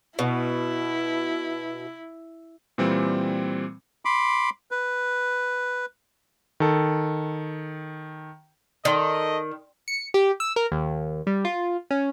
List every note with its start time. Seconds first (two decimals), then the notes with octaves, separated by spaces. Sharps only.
0.19 B2 E4
2.78 A#2 E3 G3 C4
4.05 B5 C6 D6
4.71 B4
6.60 D#3 A4
8.85 D#3 A4 D5 D#5 C6
9.88 C#7
10.14 G4
10.40 E6
10.56 A#4
10.72 D#2
11.27 G3
11.45 F4
11.91 C#4